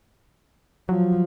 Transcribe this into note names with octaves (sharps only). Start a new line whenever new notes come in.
F3 F#3